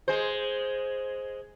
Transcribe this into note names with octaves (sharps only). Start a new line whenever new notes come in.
G#3 C5